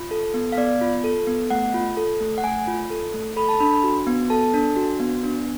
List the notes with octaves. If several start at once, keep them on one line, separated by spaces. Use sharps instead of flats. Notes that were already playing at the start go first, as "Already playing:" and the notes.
Already playing: F4
A4
B3
F5
B3 D5
F4
A4
B3
A3 F#5
F4
A4
A3
F#5
A3 G#5
F4
A4
A3
A4 B5
A5
D4 B5
F#4
B3
A4 A5
D4
F#4
B3
D4